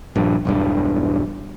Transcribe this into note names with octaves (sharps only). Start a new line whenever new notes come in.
A#1 G2
E1 B1 G2